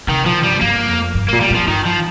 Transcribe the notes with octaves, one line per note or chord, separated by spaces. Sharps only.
C3 D#3
A#2 F3
G2 G3
G2 A#3
F2
G2
A#2 A#3
G3
A#2 F3
G2 D#3
F3